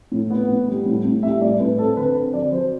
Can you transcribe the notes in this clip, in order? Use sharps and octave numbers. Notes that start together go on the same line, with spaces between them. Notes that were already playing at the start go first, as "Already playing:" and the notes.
A2
B3
A2
G3
A2
A2
G3 E5
A2 D5
A2 B4
C4 A4
D3 B4
C4
F#3 D5
F#3 C5